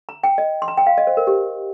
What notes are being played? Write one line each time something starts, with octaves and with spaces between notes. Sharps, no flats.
A#5
G5
D#5
C6
A#5
G5
F5
D#5
C5
A#4
G4